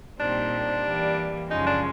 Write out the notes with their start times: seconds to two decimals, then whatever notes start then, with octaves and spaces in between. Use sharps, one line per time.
0.19 A#2 G3 C4 D4 D#4
0.85 E3 G3 A#3
1.50 F#2 C#3 F3 G#3 C#4 D#4
1.67 D4